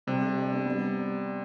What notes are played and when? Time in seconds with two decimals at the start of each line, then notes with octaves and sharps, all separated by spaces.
0.07 C3 G3
0.22 G4
0.37 D4
0.51 B3
0.66 G3